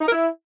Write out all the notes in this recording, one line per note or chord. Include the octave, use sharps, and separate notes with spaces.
D#4
A#4
E4